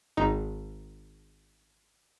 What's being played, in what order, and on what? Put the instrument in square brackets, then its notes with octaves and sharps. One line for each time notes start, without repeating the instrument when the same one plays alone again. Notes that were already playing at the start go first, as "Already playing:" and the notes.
[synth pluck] G#1 D#4